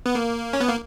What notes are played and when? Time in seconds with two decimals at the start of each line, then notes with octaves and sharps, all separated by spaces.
0.06 B3
0.15 A#3
0.53 C#4
0.60 B3
0.68 A#3